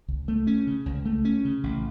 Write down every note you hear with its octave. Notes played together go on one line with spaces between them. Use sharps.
C#2
A3
C#4
C#3
C#2
A3
C#4
C#3
A1